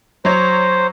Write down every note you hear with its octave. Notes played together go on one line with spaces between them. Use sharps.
F#3 C5 C#5